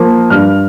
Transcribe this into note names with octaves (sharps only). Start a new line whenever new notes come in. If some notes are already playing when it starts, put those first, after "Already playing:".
Already playing: F3 A#3
G2 F6